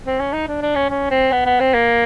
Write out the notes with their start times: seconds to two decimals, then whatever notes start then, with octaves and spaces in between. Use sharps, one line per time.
0.05 C4
0.20 C#4
0.33 D#4
0.48 D4
0.62 D4
0.75 C#4
0.90 C#4
1.11 C4
1.32 B3
1.45 B3
1.60 C4
1.74 A#3